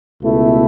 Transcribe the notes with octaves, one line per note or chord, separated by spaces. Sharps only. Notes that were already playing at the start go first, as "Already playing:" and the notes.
C#2 B2 A3 E4